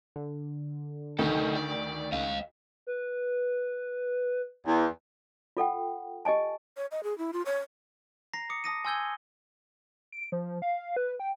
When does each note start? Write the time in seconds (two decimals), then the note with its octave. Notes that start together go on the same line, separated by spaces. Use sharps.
0.16 D3
1.19 D2 D#3 D#4 A4
1.55 D5
2.12 C#2 D#5 F5
2.87 B4
4.67 E2
5.57 F4 A4 F#5 G5
6.25 G4 D#5 G#5 A5
6.77 C#5
6.91 D#5
7.04 G#4
7.18 E4
7.33 F4
7.46 C#5
8.33 A#5 A#6 C7
8.50 D6 D#6 C#7
8.64 A5 D#6 A#6 D#7
8.85 G#5 C6 E6 G6 G#6 G7
10.12 D7
10.32 F3
10.62 F5
10.96 B4
11.20 G5